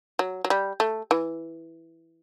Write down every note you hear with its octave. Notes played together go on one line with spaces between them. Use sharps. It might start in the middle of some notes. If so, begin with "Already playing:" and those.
F#3
F#3
G3
A3
E3